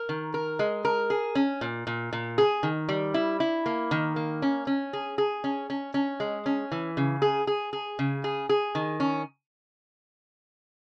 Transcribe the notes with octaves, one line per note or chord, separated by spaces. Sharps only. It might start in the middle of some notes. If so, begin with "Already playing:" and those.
Already playing: A#4
D#3
A#4
G#3
A#4
G#4
C#4
A#2
A#2
A#2
G#4
D#3
G3
E4
E4
A#3
D#3
A#3
C#4
C#4
G#4
G#4
C#4
C#4
C#4
G#3
C#4
E3
C#3
G#4
G#4
G#4
C#3
G#4
G#4
D#3
C#4